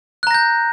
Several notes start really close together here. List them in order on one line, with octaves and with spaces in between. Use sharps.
F#6 A#5 A#6 G6